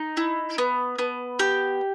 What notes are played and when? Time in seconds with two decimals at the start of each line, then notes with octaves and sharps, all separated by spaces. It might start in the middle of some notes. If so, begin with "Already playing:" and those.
Already playing: D#4
0.17 E4
0.58 B3
0.99 B3
1.39 G4